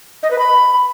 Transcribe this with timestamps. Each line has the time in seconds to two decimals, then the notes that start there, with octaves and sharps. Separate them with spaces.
0.23 D#5
0.31 B4
0.39 B5